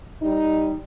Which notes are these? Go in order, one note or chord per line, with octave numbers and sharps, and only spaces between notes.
G3 D#4